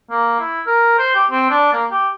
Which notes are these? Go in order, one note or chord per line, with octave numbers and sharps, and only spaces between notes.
A#3
E4
A#4
C5
G4
C4
D4
A#3
G4